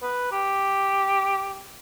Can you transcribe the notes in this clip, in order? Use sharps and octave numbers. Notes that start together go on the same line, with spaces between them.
B4
G4